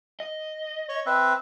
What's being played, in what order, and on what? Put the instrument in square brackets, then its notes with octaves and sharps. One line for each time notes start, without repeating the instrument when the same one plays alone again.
[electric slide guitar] D#5
[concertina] C#5
C4 B4 E5